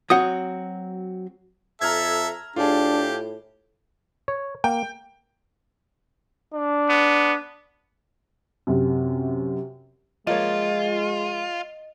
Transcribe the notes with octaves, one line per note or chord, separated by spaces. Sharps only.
F#3 C4 F#4 F#5 D#6
F2 A4 E5 A#5 F6 G#6
A2 D4 F4 G4 G#4
C#5
A#3 G5
D4
B3
F#2 C3
F3 G#3 A#3 F4 C#5 D#5